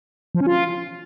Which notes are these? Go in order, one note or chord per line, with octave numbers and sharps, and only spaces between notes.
F3
C#4
F4